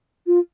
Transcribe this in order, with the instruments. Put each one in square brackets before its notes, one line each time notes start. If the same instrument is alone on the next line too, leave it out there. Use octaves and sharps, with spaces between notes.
[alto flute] F4